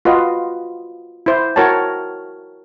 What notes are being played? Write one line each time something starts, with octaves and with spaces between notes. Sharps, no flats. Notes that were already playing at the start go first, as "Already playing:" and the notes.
F4 F#4 B4 D#5
E4 C5
E4 F#4 A#4 C#5 G5 A5